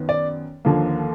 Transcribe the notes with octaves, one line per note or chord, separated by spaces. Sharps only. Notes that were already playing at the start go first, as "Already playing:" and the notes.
Already playing: F#2 D#3 B3
D5
D#2 D3 F3 A#3